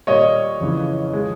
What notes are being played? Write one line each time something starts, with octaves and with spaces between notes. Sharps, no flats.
A#2 G3 A#3 C#5 D#5
F2 C#3 E3
F3 G#3